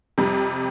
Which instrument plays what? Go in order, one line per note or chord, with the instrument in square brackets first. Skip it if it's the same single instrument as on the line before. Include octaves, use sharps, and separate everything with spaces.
[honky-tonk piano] F2 C3 G3